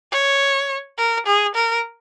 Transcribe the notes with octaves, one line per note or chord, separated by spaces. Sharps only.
C#5
A#4
G#4
A#4